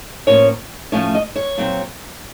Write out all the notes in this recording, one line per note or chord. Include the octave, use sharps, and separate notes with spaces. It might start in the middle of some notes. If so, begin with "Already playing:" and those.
A2 F3 A#3 C#4 C#5
A2 F3 A3 C#4 C#5
D#5
C#5
A#2 F#3 C4